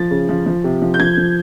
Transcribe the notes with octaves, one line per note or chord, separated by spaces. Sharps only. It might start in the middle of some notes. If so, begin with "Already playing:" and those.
Already playing: F3 A6
C#3
F3
F3
C3
F3
G6
F3 G#6
F3